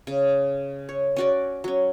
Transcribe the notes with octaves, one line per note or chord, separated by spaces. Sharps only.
C#3
C#5
C#4 F#4 D5
F#3 C#4